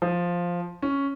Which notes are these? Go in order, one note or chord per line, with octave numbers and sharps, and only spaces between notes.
F3
C#4